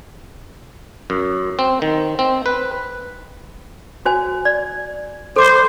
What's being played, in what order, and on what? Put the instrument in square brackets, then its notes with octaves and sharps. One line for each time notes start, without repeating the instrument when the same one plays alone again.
[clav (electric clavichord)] F#2
C4
D#3
C4
B4
[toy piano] F#4 C5 G#5
D5
[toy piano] A4 D6 [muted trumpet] C5